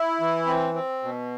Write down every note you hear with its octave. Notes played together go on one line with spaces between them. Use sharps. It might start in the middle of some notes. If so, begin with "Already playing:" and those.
Already playing: E4
E3
C4
C4
B2